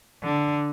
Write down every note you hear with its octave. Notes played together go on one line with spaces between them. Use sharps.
D3